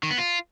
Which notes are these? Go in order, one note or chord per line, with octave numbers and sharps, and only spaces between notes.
D#3
B3
F4